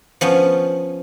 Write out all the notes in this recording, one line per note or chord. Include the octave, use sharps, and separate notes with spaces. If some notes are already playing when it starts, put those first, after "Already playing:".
F3 B3 C#4